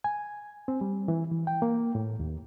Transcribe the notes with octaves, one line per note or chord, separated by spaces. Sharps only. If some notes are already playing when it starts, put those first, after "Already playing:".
G#5
C4
G3
E3
E3
G5
A#3
A2
D#2